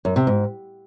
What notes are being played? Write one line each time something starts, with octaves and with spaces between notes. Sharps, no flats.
F#2
C3
G#2